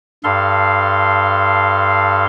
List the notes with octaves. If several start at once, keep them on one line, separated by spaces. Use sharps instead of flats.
G2 A4 F5 C6